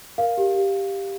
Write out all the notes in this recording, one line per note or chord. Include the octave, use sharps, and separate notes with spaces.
A#4 F5
G4
G4